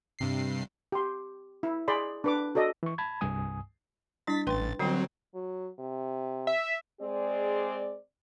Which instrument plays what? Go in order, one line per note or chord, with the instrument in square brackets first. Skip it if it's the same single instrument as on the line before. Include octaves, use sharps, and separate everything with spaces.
[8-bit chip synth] G2 C3 C7
[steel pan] G4 C6
E4
G#4 D5 B5 C6
D4 B4 D6
F#4 A4 D5 D#5
[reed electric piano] E3 C#6
A5 B5 G#6
C2 G2 G#5 D#6
[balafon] G3 D4 E4 [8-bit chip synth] A6 B6
[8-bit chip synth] A1 A6 [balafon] B4 G5 C6
[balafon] D3 G3 G5 [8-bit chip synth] F#3 C4
[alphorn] F#3
C3
[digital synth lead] E5
[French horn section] G#3 C4 G#4 D5